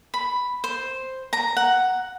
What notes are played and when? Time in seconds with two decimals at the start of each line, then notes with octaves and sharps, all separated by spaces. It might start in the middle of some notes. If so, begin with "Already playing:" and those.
0.14 B5
0.64 C5
1.33 A#5
1.57 F#5